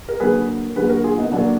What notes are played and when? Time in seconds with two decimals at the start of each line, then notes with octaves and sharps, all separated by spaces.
0.09 A#4
0.20 D3 F#3 A#3 G#4 B4
0.76 D3 F#3 A#3 G#4 B4
0.90 F#4 A#4
1.04 F4 G#4
1.18 B3 D#4
1.32 D3 F#3 A#3 D4